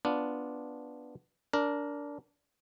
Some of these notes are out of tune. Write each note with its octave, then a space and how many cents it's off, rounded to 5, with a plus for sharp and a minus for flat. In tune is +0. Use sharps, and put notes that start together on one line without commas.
B3 +0 D4 -5 F4 +0
D4 -20 A#4 +0